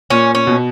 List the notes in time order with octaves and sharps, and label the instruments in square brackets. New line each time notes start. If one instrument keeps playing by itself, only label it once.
[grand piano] A#2 [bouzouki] C#4
[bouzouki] C#4
[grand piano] B2